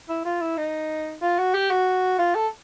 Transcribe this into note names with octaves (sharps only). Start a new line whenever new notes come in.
E4
F4
E4
D#4
F4
F#4
G4
F#4
F4
A4